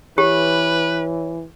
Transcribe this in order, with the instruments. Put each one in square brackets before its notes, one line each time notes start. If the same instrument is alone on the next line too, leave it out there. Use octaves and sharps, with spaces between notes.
[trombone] E3 [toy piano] G4 [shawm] B4 [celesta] C#5